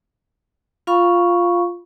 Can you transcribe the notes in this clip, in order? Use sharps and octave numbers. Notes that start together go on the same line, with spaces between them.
F4 F5 B5 C#6